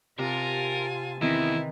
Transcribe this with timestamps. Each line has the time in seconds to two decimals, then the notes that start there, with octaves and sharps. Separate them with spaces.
0.19 C3 F4 A#4 G#5 A5
1.21 E2 D#3 E3 C4 E4